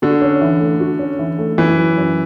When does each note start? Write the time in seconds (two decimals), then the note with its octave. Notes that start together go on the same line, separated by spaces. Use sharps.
0.02 D3 F#4
0.22 C#4
0.41 E3
0.60 A3
0.80 F#4
0.99 C#4
1.19 E3
1.39 A3
1.58 F#2 E3
1.78 F#3
1.97 F#2